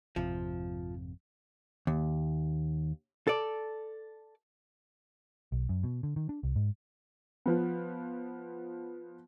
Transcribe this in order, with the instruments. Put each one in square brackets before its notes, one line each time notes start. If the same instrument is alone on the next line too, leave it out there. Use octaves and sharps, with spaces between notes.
[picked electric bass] G#1 F2 C3 [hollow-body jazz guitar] F3
[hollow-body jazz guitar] D#2
A4 D5
[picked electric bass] B1
F#2
B2
D3
D#3
D4
C2
G#2
[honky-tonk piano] F3 B3